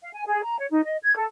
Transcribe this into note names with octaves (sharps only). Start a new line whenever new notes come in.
F5
G#5
G#4
A#5
C#5
D#4
D#5
G#6
A4